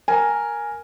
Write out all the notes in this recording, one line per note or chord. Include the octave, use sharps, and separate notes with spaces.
A#4 G#5